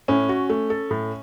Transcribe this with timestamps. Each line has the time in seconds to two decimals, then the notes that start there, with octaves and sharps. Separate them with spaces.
0.08 A2 C#4
0.29 F#4
0.49 A3
0.70 A4
0.91 A2